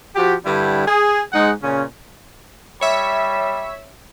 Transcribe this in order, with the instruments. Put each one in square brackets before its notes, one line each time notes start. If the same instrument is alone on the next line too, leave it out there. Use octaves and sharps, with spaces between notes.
[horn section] F3 F#4 G4
G2 D3 G3 E4
G#4
G#2 G#3 D#4 F#5
A#2 C#3 C#4
[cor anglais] G3 [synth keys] C#5 E5